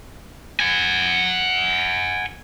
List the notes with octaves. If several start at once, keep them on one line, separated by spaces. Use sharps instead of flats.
F#5 G#5